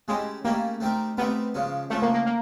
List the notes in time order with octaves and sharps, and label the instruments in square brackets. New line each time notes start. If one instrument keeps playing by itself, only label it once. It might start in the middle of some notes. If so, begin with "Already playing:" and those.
[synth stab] G#3 [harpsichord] A3 C#4 E4 G4
[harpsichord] A3 C#4 E4 G4 [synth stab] A#3
[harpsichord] A3 C4 D#4 G4 A#4
[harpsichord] A3 C4 D#4 G4 A#4 [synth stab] B3
[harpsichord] C#3 F3 G#3 C#4
[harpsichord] C#3 F3 G#3 C#4 [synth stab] A3
[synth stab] A#3
A#3
A#3